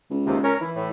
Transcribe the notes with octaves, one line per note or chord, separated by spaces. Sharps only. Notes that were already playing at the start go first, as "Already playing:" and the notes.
C#2
D#2 C3
C#4 A#4 C#5
E3 E4
A2